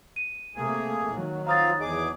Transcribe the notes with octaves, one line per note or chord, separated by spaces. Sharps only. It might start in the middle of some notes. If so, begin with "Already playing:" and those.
D#7
C3 A3 A#3 G#4
D#3 F#3
C4 F4 F5 A#5 D#6 A6
E2 G#4 D#5 D6